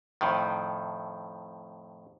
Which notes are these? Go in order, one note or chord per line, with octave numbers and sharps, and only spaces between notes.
F2 A2 D#3